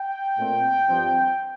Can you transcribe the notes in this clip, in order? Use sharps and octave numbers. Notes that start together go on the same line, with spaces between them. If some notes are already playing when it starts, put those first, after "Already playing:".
Already playing: G5
A#2 A3 C4
G2 F3 C4